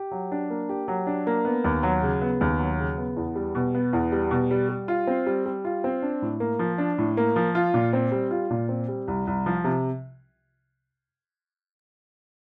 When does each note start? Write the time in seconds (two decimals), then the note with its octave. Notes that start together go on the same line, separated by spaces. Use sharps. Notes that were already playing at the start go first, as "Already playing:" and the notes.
Already playing: G4
0.11 F#3
0.32 D4
0.50 A#3
0.69 G4
0.88 F#3
1.07 D4
1.27 A#3
1.45 B3
1.64 D#2
1.83 F#3
2.02 C#3
2.21 B3
2.41 D#2
2.59 F#3
2.79 C#3
2.97 B3
3.16 E2
3.36 G3
3.55 B2
3.75 B3
3.93 E2
4.12 G3
4.31 B2
4.51 G3
4.69 G3
4.88 F4
5.07 C4
5.27 G3
5.46 G3
5.65 F4
5.84 C4
6.02 D4
6.22 A2
6.40 A#3
6.59 F3
6.78 D4
6.98 A2
7.17 A#3
7.36 F3
7.55 F4
7.74 A#2
7.93 C4
8.12 G3
8.31 F4
8.50 A#2
8.69 C4
8.88 G3
9.08 C2
9.27 C2
9.46 F3
9.64 C3